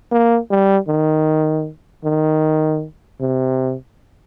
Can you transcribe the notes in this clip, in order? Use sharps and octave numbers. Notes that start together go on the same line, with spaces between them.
A#3
G3
D#3
D#3
C3